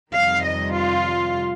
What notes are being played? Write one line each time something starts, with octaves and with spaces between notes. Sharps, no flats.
F2 C3 D#3 G3 F5
D#5
F4